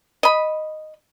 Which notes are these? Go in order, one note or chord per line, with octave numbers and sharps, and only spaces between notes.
D#5 B5